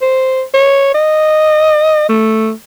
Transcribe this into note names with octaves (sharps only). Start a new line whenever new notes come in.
C5
C#5
D#5
A3